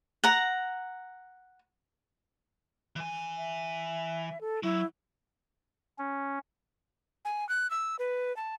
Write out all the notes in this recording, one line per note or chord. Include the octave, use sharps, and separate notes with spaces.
F#5 A#5
E3 G#5
E5
A4
F#3 E4
C#4
G#5
F#6
E6
B4
A5